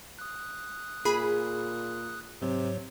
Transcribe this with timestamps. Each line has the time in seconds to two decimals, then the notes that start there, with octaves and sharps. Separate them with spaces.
0.19 D#6 F#6
1.05 A#2 G#4 B5
2.42 G#2 C3 F#3 C#5